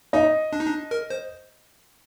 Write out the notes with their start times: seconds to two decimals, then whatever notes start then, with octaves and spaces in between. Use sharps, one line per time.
0.13 D#4 D#5
0.53 D4
0.60 D#4
0.67 D4
0.91 A#4
1.10 C5